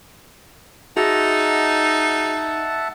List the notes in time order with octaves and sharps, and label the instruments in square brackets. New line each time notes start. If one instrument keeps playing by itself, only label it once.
[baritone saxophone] D#4 [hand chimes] F#4 G#4 A#6 [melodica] E5 F#5 A5